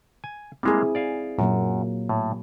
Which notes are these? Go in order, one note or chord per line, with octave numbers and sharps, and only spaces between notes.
G#5
G3 G#3 A#3 C4 E4 G#4
D5 F5 G#5
F#2 A#2 F#3 A#3
A2